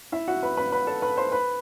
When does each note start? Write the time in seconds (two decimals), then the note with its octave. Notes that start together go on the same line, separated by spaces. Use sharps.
0.12 E4 E5
0.28 F#4 F#5
0.43 B4 B5
0.57 B4 B5
0.72 B4 B5
0.87 A4 A5
1.02 B4 B5
1.17 C5 C6
1.32 B4 B5